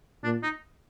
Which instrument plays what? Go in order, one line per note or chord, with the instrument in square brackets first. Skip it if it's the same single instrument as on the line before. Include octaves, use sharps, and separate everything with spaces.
[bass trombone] A#2 [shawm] D4
[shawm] D#4